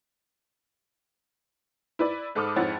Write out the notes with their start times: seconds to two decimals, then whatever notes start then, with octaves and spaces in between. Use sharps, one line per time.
1.99 E4 B4 D5
2.35 G#2 A4 B5 D6 D#6 F6
2.56 F2 G#2 E4 C#5 F#5 A6